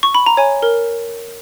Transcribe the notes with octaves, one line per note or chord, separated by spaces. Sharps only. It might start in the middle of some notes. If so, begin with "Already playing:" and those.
C#6
B5
A#5
C#5 G#5
A#4